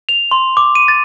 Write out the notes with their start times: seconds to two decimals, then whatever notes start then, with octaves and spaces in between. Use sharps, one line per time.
0.09 F7
0.31 C6
0.57 D6
0.75 D#7
0.88 A6